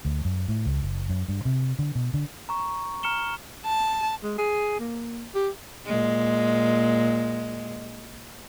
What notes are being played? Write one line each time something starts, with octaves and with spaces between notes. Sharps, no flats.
D2
F#2
A2
C#2
F#1
F#2
G2
C3
D3
B2
D3
A#5 C#6
A#5 F6 C#7 E7 G7
A5
G#3
G#4
A#3
G4
A#2 G#3